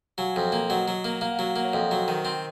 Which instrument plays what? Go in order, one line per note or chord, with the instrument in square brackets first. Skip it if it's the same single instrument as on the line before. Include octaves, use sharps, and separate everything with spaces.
[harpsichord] F#3 [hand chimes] F5 G#5
[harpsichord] F2
A#3
[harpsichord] F#3 [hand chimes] D#5 F#5
[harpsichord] F#3
A#3
[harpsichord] A#3 [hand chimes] F5
[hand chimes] F#5
F5
[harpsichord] F#3 [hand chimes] F#5
[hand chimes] F5
[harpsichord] A#3 [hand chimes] F#5
[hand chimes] C#5 F5
[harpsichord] F2 [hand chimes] C5 D#5
[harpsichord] F#3
D#3
C4